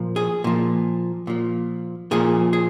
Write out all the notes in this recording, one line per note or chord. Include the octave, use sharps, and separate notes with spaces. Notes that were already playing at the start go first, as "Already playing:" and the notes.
Already playing: A#2 F3
G#4
A#2 F3
A#2 F3
A#2 F3 G#4
G#4